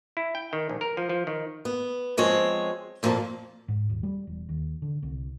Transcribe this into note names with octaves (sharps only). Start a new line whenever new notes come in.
E4
G5
D#3
A#1
A#4
F3
F3
D#3
B3
F3 G#3 C4 C#5
F2 A#2 F3 A#3 A5
G#2
D#1
G3
E1
D#2
D3
C2